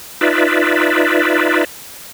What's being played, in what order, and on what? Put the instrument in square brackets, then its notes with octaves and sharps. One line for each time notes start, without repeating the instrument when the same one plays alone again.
[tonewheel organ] D#4 F4 B4 D5 E5